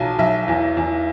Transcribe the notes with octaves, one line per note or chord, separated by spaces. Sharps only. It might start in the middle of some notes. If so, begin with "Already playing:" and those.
Already playing: B1 F#3 G#5 A5
B1 E5
E2
E2